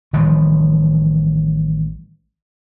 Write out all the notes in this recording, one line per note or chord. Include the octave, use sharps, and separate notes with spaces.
A1 D#3 F3 G3